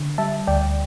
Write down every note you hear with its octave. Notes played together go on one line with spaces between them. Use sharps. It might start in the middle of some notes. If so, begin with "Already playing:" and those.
Already playing: D3
G3 E5 A5
D2 D5 G5